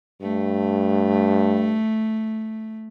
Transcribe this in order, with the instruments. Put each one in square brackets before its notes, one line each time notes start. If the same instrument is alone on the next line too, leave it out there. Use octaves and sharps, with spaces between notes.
[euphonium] G2 [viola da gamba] A3